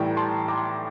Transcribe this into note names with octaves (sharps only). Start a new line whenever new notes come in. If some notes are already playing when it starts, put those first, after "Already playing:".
Already playing: A2 E3 G3 G5 A#5
A5 C6
A#5 D6